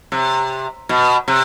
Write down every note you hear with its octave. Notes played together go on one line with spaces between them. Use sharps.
C3
B2
C3